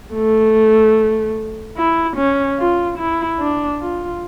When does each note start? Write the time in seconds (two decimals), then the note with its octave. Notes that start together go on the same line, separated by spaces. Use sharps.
0.14 A3
1.77 E4
2.17 C#4
2.59 F4
2.98 E4
3.40 D4
3.81 F4